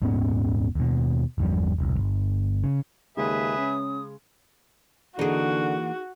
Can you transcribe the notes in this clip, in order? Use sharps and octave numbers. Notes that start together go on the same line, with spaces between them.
D#1 G#2 B3 C#4
D#2 B2
G1 E2 F3 G3
E1 C2
G1
C#3
D#2 C#3 G#3 G#4 B4 E5 D#6
C#4
D3 E3 A#3 D#4 F#4 G#4